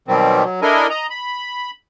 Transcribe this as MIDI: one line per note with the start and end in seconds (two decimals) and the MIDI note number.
0.08 0.44 47
0.08 0.44 51
0.08 0.44 54
0.08 0.44 55
0.08 0.44 60
0.44 0.60 54
0.62 0.87 62
0.62 0.87 64
0.62 0.87 69
0.62 0.87 70
0.62 0.87 75
0.62 0.87 80
0.90 1.07 75
0.90 1.07 82
1.10 1.71 83